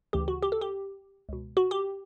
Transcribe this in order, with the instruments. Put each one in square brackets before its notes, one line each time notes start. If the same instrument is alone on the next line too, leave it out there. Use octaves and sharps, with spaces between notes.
[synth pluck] D2 C#3 E3 G4
F#4
G4
A4
G4
C#2 B2
F#4
G4